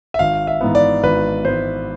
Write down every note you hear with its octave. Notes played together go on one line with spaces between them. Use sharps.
E5
G#1 F5
E5
G#2 E3 B3
D5
G#1 B4
G#2 E3 B3 C5